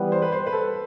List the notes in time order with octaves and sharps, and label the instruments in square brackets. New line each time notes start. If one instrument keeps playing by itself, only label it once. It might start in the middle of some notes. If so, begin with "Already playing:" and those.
Already playing: [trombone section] E3 G3 B3 [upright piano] B4
[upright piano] C5
B4
C5
B4
A4